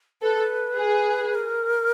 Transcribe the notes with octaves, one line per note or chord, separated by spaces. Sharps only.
A4 B4
G#4
A#4